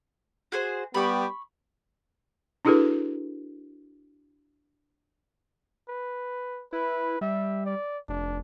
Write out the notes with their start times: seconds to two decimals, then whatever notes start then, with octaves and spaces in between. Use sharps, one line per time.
0.52 F#4 G#4 C5
0.94 G3 B3 G4 B5 C#6
2.65 D4 E4 F#4 G#4 A4 B4
5.88 B4
6.73 E4 B4
7.21 G3 E5
7.66 D5
8.09 F1 D4